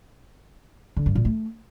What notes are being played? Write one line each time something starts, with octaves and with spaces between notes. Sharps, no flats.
D3
G2
A#2
A3